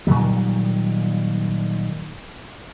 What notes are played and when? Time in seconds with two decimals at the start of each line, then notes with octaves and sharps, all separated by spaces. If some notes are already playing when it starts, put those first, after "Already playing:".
0.07 A#2 D#3 F#3 G3